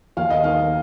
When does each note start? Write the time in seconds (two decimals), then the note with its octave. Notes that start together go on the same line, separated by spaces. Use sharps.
0.17 D#2 F5
0.30 D#5
0.44 D#3 A#3 F5